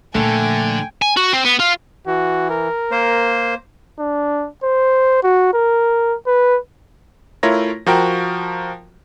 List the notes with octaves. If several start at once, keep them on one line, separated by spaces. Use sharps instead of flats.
A#2 D3 F3 A3 G5 G#5
G#5
F#4
C4
B3
F4
E3 F#4
A#4
A#3 C5
D4
C5
F#4
A#4
B4
A3 E4 F4 A#4 C#5 A#6
F3 F#4 A#4 G5 A#5